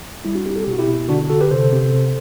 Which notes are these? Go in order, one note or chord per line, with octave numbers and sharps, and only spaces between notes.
G3 E4
D4 F#4
C4 E4 G4
A4
G4
B2 F#4
E4 G4
B2
D3 D4 F#4
D3 F#4 A4
G4 B4
C3 A4 C5
C3
C3